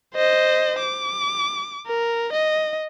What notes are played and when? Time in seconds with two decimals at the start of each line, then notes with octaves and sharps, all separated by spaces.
0.15 C5 D#5
0.79 D6
1.86 A#4
2.33 D#5